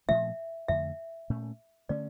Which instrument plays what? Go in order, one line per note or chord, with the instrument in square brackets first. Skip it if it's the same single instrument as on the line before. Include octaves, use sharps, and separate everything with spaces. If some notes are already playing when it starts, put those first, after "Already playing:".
[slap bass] A#2 F3 A3 C#4 [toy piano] E5
[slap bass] F2 D3 A3 [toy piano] E5
[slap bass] A#2 A3 C#4
[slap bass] D3 A3 C#4 [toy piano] D5